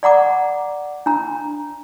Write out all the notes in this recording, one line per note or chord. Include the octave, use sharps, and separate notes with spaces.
D5 F#5 A#5 D6
D4 A#5